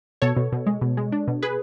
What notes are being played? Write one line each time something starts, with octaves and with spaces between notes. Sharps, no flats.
B2 A4 C#5
B2
B2
G#3
B2
G#3
D4
B2
G#4 B4